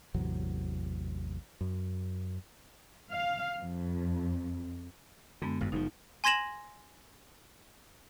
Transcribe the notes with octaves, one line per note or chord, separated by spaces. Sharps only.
A1 E2 C3 F#3
F#2
F5
F2
F#2 D3 G#3 B3
G#1 G2
F#1 C3 F3 D#4
G#5 C6 G#6 A#6 E7 F#7